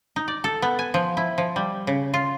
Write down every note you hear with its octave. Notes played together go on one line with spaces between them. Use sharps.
D#4
D5
A4
B3
G#5
F3
E4
F3
G3
C#3
F4